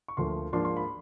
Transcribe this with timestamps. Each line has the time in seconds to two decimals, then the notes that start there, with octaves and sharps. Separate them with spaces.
0.08 C#6
0.17 D2 D3 F3 A#3 C6
0.52 G#2 F3 A#3 D4 C6
0.65 C6
0.77 B5